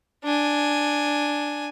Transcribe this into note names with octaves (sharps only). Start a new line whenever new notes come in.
D4 G#5